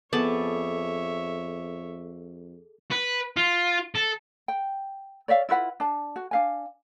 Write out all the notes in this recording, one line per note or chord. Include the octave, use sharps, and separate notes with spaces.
F2 B3 G#4 A4 C#5 E5 A5 D6
B4
F4
A4
G5
C#5 D5 E5 F5
E4 F4 B4 F#5
D4 A5
F#4
D4 F5 G#5